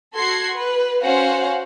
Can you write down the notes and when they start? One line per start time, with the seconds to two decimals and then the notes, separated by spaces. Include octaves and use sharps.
0.13 F#4 A4 C6 G#6 C7
0.53 B4
1.00 C#4 F#4 C5 F5 F#5